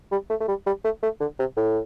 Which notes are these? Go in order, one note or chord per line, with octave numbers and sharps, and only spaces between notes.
G3
A3
A3
G3
G3
A3
A3
D3
C3
A2